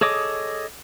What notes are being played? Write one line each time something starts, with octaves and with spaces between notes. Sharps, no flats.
G#4 A4 C#5 D#5 D6